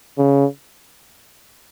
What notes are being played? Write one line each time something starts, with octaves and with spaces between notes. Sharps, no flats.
C#3